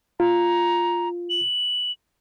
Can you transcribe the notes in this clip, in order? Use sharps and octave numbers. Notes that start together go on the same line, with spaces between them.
F4 A#5
F#7